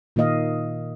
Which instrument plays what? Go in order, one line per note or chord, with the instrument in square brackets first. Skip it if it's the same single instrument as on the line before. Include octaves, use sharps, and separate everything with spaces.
[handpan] A#2 D#3 A#3 D#5 F5